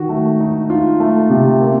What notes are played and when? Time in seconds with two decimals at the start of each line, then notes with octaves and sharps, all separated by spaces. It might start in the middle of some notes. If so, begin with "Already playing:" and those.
Already playing: D#3 F#4
0.09 A3
0.40 D#4
0.69 D#4 F4
1.00 A3
1.30 C3
1.60 A#3